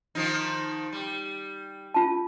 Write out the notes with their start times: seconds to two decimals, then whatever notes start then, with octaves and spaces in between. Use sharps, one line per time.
0.15 D#3 F3 D#4
0.92 G3
1.94 F4 A5